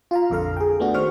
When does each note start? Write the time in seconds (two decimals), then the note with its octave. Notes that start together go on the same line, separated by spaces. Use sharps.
0.11 F4 F5 A#5
0.30 A#1 F2 D3 A4 F5 A#5
0.57 G#4 G5
0.80 A3 B3 D4 F#4
0.94 D#3 F#4 C5 C#6 F6